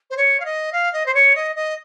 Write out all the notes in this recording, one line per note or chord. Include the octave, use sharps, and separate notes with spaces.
C5
C#5
F5
D#5
F5
D#5
C5
C#5
D#5
D#5